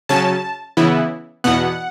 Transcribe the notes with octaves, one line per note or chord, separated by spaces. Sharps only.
C#3 F#3 C#4 A5
C#3 E3 B3 E4
E2 B2 B3 F#5